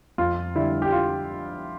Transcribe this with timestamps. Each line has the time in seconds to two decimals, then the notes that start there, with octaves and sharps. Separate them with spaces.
0.18 F2 F4
0.55 D3 G3 E4
0.82 G4
0.92 F4